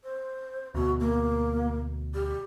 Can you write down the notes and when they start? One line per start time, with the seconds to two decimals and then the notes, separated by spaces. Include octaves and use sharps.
0.04 C5
0.74 D2 B2 F#4
1.00 A#3
2.14 G4